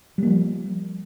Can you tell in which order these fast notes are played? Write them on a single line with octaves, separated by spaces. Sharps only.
G3 A#3 F3